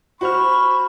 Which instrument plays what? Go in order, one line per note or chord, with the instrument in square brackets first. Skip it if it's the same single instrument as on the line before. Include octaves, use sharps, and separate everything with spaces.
[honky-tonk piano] F#4 C5 F6 [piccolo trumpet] B5 [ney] C#6